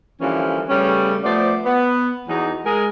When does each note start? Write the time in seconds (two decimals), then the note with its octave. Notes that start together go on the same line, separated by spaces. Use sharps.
0.21 D3 E3 F3 G3 A#3 C#4
0.69 C#3 G3 A3 B3 C#4
1.24 F3 A3 B3 C5 D5
1.64 B3
2.28 E2 F#3 D#4
2.65 G#3 G#4 A#4